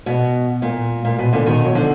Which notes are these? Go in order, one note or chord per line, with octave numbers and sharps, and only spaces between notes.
B2
A#2
A#2
B2
A#2 D3
B2 D#3
F#3
D3 F3